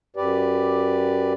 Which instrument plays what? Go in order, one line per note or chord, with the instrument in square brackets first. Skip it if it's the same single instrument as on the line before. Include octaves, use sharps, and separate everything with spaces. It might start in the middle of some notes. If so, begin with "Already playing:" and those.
[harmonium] F#2 G4 B4 D5